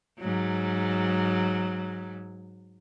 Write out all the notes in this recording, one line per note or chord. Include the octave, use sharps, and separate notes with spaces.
G#2 F#3